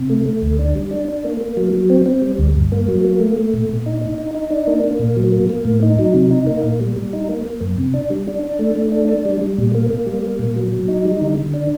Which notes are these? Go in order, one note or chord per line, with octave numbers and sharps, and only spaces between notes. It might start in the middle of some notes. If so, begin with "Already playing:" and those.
Already playing: C3
A3
A3
D2
D4
G3
D4
D4
A#3
A#3
F#3
F#3
C4
C4
G3
D2
G2
A#3
F#3
A#3
A3
A3
A#2
A#2
D#4
D#4
D#4
D#4
D4
A#3
A#3
A#2
F#3
A#3
A#3
A2
D#4
F#3
C3
D#4
A#3
A#2
G3
G3
D#4
A#3
A#3
F#2
C3
D4
G3
D4
D4
A3
A3
D4
D4
G3
G3
A#2
A#3
A#3
G3
A#3
A#2
F#3
F#3
D#4
G3
D3
D3
D4